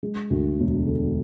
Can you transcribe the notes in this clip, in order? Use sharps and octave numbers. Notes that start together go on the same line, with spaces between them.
G#3
D2
E1
D3